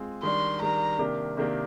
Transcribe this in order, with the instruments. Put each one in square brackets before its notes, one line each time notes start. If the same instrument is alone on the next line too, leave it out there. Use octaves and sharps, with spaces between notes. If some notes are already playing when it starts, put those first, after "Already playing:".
Already playing: [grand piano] G#3 C4 F4 G#4
[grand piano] D#3 G3 D4 [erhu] C6
[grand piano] D#3 G3 D4 [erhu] A#5
[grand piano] C3 D#3 A#3 D4 G4
C3 D#3 A#3 D4 G4